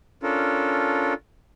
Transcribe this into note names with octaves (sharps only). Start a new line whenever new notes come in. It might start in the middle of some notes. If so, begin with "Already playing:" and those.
C#4 D4 F4 A4 A#4